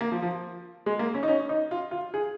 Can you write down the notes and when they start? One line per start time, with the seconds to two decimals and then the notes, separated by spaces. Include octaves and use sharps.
0.01 A#3
0.12 F3
0.22 F3
0.86 G#3
0.99 A#3
1.14 C#4
1.23 D#4
1.28 C#4
1.49 D#4
1.71 F4
1.91 F4
2.14 G#4